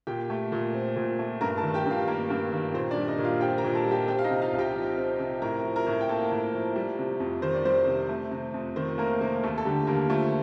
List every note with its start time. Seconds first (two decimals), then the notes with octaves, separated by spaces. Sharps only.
0.07 A#2 G4 G5
0.30 A3
0.52 A#2
0.74 C4
0.96 A#2
1.19 A3
1.41 G2 A#4 A#5
1.58 A4 A5
1.63 D#3
1.74 G4 G5
1.86 G2
1.91 F4 F5
2.08 A#3 A#4
2.30 G2
2.52 D#3
2.74 A#2 C4 C5
2.91 D4 D5
2.97 G3
3.08 D#4 D#5
3.18 A#2
3.25 F4 F5
3.41 C4 G4 G5
3.58 A#4 A#5
3.64 A#2
3.75 A4 A5
3.85 G3
3.91 G4 G5
4.08 C4 G4 G5
4.19 F5
4.24 D#4 D#5
4.31 C3
4.42 F4 F5
4.53 C2
4.58 G4 G5
4.76 F3
4.98 C4
5.19 C3
5.42 A2 A#4 A#5
5.64 F3
5.76 A#4 A#5
5.87 A2
6.01 G5
6.09 A#3 A4 A5
6.32 A2
6.53 F3
6.76 G3
6.99 C3
7.20 F2
7.42 D#3 C5
7.55 D5
7.65 G3 C4 C5
7.87 C3
8.09 A3
8.31 C3
8.54 F2
8.76 D#3 C4 C5
8.98 A3 A#3 A#4
9.21 C3 A#3 A#4
9.43 D#2 A3 A4
9.58 A4
9.65 D3 G3 G4
9.87 D#2 A#3 A#4
10.10 F3 A3 A4